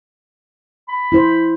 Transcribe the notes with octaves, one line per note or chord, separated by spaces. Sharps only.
B5
E4 C5